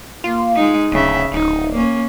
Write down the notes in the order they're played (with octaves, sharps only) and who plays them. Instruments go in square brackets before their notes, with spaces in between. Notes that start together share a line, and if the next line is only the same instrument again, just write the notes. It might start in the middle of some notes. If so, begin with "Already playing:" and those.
[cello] A#3 [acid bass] F4
[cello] G#3 D#4
[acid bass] D1 [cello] C#3 E5
[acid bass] D1 [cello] D#4
[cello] A#3 C#4